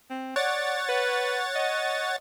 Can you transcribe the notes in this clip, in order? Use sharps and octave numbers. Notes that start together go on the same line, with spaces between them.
C4
C#5 D5 F#5 A6
B4
D#5